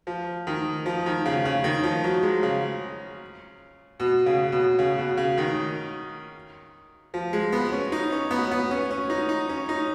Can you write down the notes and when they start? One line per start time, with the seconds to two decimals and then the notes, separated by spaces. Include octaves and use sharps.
0.07 F3
0.47 D#3
0.86 F3
1.06 D#3
1.26 C#3
1.45 C#3
1.64 D#3
1.83 F3
2.04 F#3
2.23 G#3
2.43 C#3
4.00 B2
4.26 C#3
4.52 B2
4.79 C#3
4.98 B2
5.17 C#3
5.38 D#3
7.14 F3
7.33 G#3
7.53 B3
7.72 C#4
7.92 D#4
8.12 C#4
8.31 B3
8.51 B3
8.71 C#4
8.91 C#4
9.10 D#4
9.29 D#4
9.49 C#4
9.69 D#4